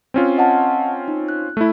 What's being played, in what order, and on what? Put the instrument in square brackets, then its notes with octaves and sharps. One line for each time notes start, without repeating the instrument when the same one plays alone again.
[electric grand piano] C4 C#4 F4
[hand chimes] D#5 F#5 A5
D#4
F#6
[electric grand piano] A3 E4